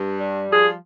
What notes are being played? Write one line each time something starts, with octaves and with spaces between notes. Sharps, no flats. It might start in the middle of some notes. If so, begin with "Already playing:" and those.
Already playing: G2
G3
F3 G#4